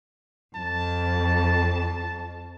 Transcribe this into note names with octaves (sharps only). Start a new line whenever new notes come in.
F2 A5